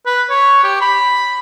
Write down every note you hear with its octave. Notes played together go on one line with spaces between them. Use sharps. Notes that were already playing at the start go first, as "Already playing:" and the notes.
B4
C#5
G4
B5